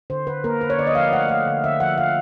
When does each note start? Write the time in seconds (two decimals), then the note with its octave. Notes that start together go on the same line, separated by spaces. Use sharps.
0.10 D3 C5
0.27 D3 B4
0.44 A#3 A#4
0.61 D3 B4
0.70 C#5
0.78 D3 D5
0.87 D#5
0.95 F3 F5
1.12 A3 F#5
1.29 A3 F5
1.47 D3
1.64 D3 E5
1.80 F3 F#5
1.98 D3 F5